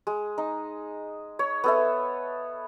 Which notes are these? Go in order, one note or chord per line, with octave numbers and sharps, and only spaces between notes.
G#3
D#4
C#5
B3 A4 E5